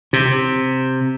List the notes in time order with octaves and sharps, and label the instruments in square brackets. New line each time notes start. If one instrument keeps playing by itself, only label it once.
[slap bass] C3